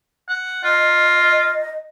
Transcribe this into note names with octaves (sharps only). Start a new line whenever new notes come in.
F#5
F4 D#5